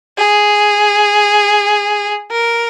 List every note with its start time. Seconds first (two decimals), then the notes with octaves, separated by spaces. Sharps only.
0.18 G#4
2.32 A#4